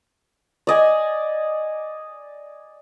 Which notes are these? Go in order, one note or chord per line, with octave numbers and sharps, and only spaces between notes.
D5 D#5 G#5